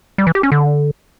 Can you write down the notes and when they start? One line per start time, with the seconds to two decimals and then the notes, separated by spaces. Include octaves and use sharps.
0.18 G3
0.27 E3
0.35 G4
0.43 C#4
0.52 D3